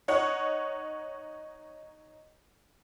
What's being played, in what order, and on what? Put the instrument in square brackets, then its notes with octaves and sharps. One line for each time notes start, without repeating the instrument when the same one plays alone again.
[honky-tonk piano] D#4 C#5 F#5